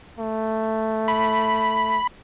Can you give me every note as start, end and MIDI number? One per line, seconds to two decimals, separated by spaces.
0.19 2.00 57
1.08 2.07 83